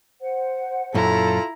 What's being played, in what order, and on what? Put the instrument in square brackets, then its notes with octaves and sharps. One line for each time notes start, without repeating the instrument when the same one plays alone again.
[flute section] C5 F#5
[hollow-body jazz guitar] F#2 A#2 [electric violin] E4 A#5 [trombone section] F4 A4